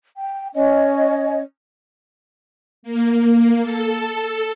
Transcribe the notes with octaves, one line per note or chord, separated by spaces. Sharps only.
G5
C#4 C#5 D#5
A#3
A4